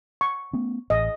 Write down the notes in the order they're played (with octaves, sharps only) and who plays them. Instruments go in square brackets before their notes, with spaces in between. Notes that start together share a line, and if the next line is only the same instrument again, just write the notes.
[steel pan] C#6
[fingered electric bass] A3 B3 C#4
[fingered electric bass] A1 [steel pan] D#5